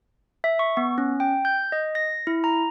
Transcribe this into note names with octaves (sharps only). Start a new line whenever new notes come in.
E5
C#6
B3
C#4
G5
G6
D#5
A#6
E4
A#5